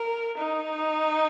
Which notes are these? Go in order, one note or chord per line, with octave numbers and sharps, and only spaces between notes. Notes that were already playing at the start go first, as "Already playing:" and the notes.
Already playing: A#4
D#4